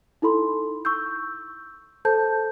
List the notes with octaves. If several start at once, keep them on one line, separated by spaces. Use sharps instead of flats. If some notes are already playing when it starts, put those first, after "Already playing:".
D#4 E4 A4 B5 C6
C#6 E6 G6
A4 C5 A5 G6